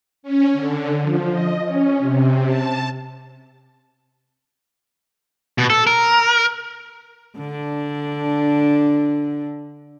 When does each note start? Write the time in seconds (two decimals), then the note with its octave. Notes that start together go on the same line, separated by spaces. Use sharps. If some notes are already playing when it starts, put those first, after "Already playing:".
0.23 C#4
0.53 D3
1.01 F3
1.30 D#5
1.65 C#4
1.99 C3
2.46 A5
5.58 B2
5.70 A4
5.87 A#4
7.38 D3 D4